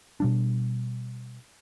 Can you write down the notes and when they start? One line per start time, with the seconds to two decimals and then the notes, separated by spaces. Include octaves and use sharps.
0.20 B2 G3 D4